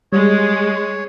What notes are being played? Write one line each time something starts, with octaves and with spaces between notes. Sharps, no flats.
G3 G#3 C#5